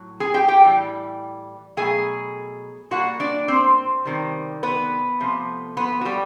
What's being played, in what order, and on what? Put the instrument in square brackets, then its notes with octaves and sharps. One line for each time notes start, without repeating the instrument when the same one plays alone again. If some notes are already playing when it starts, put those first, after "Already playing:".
Already playing: [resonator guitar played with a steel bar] A2 F#3
G#4 G#5
G4 G5
G4 G5
A2 E3 G3
B2 F#3 A3 G#4 G#5
A#2 G3 F#4 F#5
D4 D5
C4 C5
C3 D#3 G3
B3 B4
C3 F3 A3
B3 B4
F#4
G3 G4